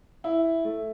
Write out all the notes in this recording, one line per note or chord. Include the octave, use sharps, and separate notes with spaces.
E4
A3